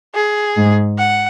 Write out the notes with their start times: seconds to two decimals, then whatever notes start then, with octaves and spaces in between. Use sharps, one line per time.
0.15 G#4
0.56 G#2
0.98 F#5